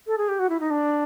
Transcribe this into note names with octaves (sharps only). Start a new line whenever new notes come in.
A4
G#4
G4
F#4
E4
D#4
D4